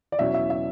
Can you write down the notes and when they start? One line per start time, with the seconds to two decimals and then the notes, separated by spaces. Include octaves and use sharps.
0.12 D5
0.19 E2 B2 F#3 C#4 E5
0.34 E5
0.50 E5